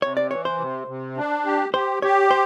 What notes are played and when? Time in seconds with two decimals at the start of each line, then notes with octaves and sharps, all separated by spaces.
0.02 C3 C#5
0.17 D5
0.31 E3 C#5
0.45 C5
0.60 C3
0.87 C3
1.17 D4
1.45 G4
1.74 G4 C5
2.02 G4 C#5
2.31 C5